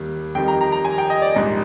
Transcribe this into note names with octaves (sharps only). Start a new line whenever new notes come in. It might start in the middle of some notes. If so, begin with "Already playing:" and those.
Already playing: D#2 D#3 G3
F2 D#3 G3 G5
A#5
A#5
A#5
G#5
G5
D#5
D5
A#1 G#2 G3